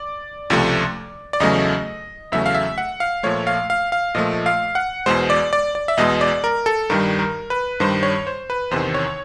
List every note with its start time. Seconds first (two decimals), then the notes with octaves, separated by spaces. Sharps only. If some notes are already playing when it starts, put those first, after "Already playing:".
Already playing: D5
0.50 C#2 C3 F3 A3
1.33 D5
1.40 E2 C#3 F#3 A3 D#5
2.32 E2 C#3 F#3 A3 E5
2.46 F5
2.54 E5
2.78 F#5
3.00 F5
3.23 A#2 F3 A3 C#5
3.47 F5
3.70 F5
3.92 F5
4.15 A#2 F3 A3 D#5
4.46 F5
4.75 F#5
5.06 E2 B2 G#3 C5
5.30 D5
5.53 D5
5.75 D5
5.88 E5
5.97 E2 B2 G#3 D#5
6.21 D5
6.44 A#4
6.66 A4
6.90 G2 D#3 G3 A#4
7.19 A#4
7.50 B4
7.80 G2 D#3 G3 C5
8.03 C#5
8.27 C5
8.50 B4
8.71 E2 C3 D#3 C5
8.94 C#5